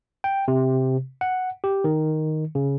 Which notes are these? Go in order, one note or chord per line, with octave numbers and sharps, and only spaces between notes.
G5
C3
F#5
G4
D#3
C#3